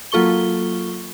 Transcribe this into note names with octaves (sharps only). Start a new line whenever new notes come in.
F#3 A#3 F4 A4 C#6 G7